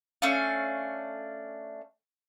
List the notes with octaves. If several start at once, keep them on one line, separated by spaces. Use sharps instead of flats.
A3 C#4 D4 F5